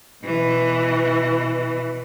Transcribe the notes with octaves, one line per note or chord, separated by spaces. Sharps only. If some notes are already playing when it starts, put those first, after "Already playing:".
B2 E3